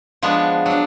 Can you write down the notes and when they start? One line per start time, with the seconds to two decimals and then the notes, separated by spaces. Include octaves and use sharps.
0.23 F3 G#3 B3 D4
0.66 F#3 D4